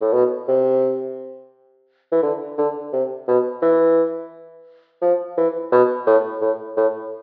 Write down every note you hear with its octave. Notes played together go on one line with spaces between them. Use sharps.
A2
B2
C3
E3
D3
D3
C3
B2
E3
F3
E3
B2
A2
A2
A2